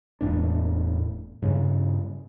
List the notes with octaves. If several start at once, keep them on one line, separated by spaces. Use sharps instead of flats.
E1 E2 A2 D4
G2 C#3 C#4